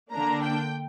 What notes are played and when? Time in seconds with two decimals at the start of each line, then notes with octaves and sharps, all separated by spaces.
0.13 D3 A#3 D4 A#5
0.43 G5